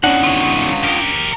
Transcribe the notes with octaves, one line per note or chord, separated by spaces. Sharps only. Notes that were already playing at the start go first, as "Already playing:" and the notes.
E2 D#3 C#4 D4 F#5
F4 C#5
G4 A#4